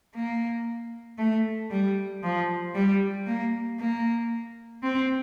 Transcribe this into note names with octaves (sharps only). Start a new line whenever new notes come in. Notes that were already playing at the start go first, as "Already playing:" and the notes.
A#3
A3
G3
F3
G3
A#3
A#3
C4